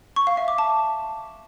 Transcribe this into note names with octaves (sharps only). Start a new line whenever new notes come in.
C#6
F5
E5
D6
A5